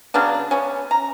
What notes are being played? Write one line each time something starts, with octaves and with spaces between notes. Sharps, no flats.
C#3 F#3 B3 D4
B3 C#4
A#5